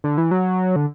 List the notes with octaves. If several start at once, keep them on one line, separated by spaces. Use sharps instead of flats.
D3
E3
F#3
D3